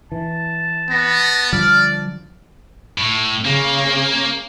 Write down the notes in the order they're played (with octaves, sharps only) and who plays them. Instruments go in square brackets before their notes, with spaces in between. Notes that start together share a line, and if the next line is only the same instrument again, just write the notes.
[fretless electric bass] E3 [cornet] A5
[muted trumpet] B3 [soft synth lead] A#6
[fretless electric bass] D3 F3 G3 [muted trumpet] D5 [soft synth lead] F6
[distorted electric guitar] A2
[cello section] C#3 [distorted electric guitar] A#3